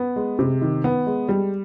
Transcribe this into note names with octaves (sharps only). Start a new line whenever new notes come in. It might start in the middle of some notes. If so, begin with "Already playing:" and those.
Already playing: B3
G#3
C3
D#3
B3
G#3
G3